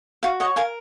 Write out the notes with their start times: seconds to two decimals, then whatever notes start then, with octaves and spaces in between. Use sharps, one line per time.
0.23 F#4 F5
0.40 C#5 D#5 F#5
0.56 A#4 F5 G#5